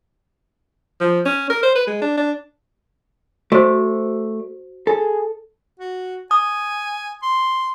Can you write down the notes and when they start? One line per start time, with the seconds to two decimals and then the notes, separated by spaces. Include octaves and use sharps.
1.00 F3
1.26 C#4
1.50 A#4
1.63 C5
1.75 B4
1.87 G#3
2.02 D4
2.17 D4
3.52 A3 F#4 C5 D5
4.87 G#4 A4
5.79 F#4
6.31 G#5 D#6
7.23 C6